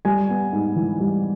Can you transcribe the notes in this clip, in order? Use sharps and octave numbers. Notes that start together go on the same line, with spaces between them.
G3 G#5
B3
G#2
E3
G3